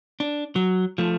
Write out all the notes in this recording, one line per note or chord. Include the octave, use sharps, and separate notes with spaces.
D4
F#3
F3 A3